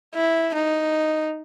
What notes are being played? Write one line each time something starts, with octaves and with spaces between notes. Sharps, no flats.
E4
D#4